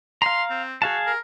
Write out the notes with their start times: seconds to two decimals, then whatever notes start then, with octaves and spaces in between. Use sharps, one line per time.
0.22 F5 A#5 C6
0.50 C4
0.82 F#4 G#4 F5 A5
1.06 A#4